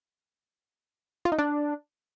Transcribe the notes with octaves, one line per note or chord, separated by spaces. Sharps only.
F4
D#4
D4